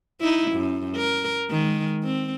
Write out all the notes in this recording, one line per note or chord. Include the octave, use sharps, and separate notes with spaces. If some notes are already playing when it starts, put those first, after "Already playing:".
D#4 E4
F#2
A#4
D#3 G#3
C4